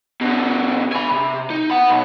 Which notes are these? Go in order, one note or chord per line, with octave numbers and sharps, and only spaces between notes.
B2 D3
G#5 B5
C3
D#4
F#5 B5
B1